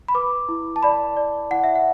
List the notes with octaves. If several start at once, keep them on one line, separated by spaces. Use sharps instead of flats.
B5
B4 D6
E4
A5
D5 B5
D5
E4 F#5
E5
F#5